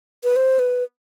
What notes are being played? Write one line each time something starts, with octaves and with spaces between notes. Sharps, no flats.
B4
C5
B4